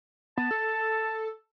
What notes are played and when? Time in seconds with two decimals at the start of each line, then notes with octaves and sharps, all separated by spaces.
0.37 B3 A5
0.51 A4